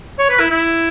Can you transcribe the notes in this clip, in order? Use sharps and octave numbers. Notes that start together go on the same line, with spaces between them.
C#5
B4
E4
E4